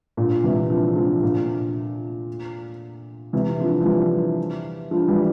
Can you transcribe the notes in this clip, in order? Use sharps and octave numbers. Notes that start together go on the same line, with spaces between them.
A#2 D3
C3 E3
D3 F3
D3 F3
A#2 D3
C3 E3
D3 F3
F3
E3 G3
D3 F3
E3 G3